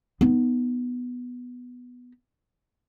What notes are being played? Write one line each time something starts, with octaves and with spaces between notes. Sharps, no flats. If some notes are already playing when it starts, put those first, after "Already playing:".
B3 D#4